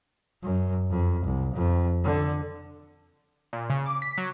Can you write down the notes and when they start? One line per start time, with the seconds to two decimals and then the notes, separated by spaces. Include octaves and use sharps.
0.43 F#2
0.90 F2
1.25 C2
1.54 F2
2.04 D3
3.53 A#2
3.70 C#3
3.86 D6
4.02 B6
4.18 F#3